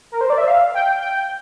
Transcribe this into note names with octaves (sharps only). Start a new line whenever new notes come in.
A#4
C5
D5
E5
F5
G5
G5